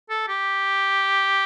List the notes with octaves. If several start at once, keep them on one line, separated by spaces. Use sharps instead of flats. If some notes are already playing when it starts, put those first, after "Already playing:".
A4
G4